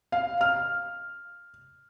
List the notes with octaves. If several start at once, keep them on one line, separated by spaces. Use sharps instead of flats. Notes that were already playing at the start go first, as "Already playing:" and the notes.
F5
F6